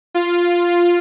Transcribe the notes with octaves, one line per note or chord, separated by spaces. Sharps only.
F4